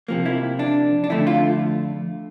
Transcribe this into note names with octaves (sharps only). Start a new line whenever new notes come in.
C3 F3 A#3
E4
D4
D4
F2 D3 A3 E4
F4